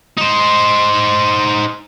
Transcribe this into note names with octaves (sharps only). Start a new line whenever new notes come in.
D#4 C5